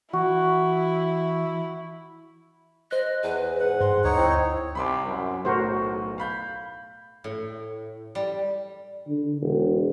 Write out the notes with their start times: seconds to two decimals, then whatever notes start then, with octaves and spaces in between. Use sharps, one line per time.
0.13 E3 E4 F#4
2.91 C5 D#5 F#6
3.23 E2 B4
3.60 G#2 F#5
3.81 G2 C6
4.04 D2 D#4 C#5 F#5
4.17 C4 E4
4.75 C2 B5 C6 D6
5.07 F#2
5.45 B1 A2 F#4 A#4 C5
6.18 F5 B5 G6
7.24 A2
8.15 G3
9.07 D3
9.41 E1